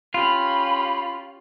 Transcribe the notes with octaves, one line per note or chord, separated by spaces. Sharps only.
C#4 F4 G4 B5